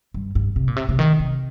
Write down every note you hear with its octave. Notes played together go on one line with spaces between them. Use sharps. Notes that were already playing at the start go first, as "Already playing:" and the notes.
G2
G2
C3
A#2
C3
C3
D#3
C3